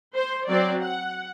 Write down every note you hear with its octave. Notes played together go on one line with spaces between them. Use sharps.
C5
F#3 C4 D5
F#5